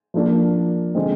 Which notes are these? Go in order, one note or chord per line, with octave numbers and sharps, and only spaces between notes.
F3 A#3 D4
D3 G#3 C4